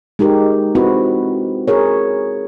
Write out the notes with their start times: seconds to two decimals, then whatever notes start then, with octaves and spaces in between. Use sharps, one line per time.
0.19 G#3 D#4 G4 A#4
0.75 C4 E4 F#4 B4
1.68 G#4 A#4 C#5